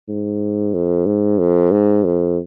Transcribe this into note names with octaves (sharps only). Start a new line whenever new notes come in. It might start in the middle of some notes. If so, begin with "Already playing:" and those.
G#2
F2
G#2
F2
G#2
F2